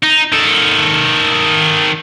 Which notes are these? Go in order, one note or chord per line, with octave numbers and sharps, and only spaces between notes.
D#4
D#3 A4